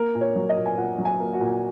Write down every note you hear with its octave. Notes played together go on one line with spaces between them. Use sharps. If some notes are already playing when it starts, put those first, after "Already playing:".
Already playing: A#3 A#4
A#2
C#5
F#3
D#5
A#2
G#5
A#2 F#5
F#3
G#5
A#3
F#4
A#2